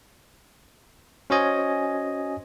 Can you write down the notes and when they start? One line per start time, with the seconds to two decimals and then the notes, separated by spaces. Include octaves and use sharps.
1.30 C#4 F#4 C5 C#5 D#5 G#5